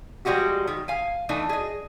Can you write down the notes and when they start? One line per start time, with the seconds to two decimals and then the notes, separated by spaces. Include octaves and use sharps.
0.25 F3 G3 G#3 F#4 G4
0.68 D#3
0.88 F5 G#5
1.29 E3 A3 D4 D#4
1.49 G#4 D#5